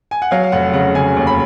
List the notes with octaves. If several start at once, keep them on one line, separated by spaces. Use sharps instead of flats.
G#5
F#5
F#3 F5
F5
F1 F#5
C#3 F#5
C#3 G#5
D#2
B5